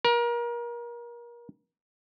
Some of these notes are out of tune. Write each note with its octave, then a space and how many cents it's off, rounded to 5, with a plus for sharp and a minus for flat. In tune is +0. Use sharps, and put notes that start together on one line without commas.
A#4 +30